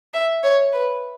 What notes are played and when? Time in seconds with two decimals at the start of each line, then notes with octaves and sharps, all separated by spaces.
0.13 E5
0.43 C#5
0.73 B4